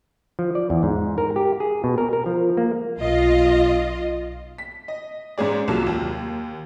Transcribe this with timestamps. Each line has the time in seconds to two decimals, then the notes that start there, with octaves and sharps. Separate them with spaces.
0.39 F3
0.55 D5
0.70 E2
0.83 G#2
1.18 A#4
1.36 G4
1.60 G#4
1.84 B2
1.98 A#4
2.13 A#4
2.26 F3
2.57 A#3
3.01 B1 F4 D#5
4.58 B6
4.88 D#5
5.38 G#2 C#4 G#4 D5
5.68 C2 F#3 A#3 F4 A5
5.86 D#2